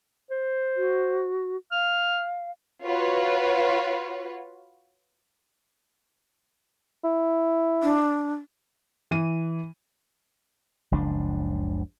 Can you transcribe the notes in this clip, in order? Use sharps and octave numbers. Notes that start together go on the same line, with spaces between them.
C5
F#4
F5 F6
F4 F#4 B4 C#5
E4
D4
E3 D#7
F#1 C#2 F3 D4